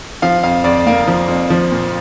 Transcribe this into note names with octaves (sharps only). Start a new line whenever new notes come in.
F3 F5
F2 F5
F2 D5
A#3 F5
F3
F2
F3
A#2